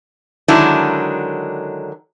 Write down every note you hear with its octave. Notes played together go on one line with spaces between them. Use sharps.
D3 D#3 F#3 G#3 D4 E4